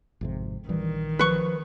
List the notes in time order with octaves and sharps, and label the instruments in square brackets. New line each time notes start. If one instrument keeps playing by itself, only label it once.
[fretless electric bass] G#1 F2 C3
[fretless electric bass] A#1 E3 G3 [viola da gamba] D#3
[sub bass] F3 [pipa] B4 C#6